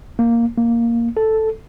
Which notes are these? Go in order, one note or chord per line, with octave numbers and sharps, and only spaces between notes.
A#3
A#3
A4